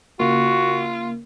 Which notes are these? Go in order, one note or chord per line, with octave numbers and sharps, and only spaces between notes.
C#3 A#3 F4 F#4